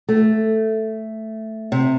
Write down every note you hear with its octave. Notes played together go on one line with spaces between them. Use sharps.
A3
C3